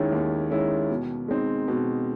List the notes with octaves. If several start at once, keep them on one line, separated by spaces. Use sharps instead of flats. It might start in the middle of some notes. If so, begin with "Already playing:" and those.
Already playing: D#2 D#3 G#3 C#4 E4
D#2
D#3 G#3 C#4 E4
B2
G#3 C4 D#4
B2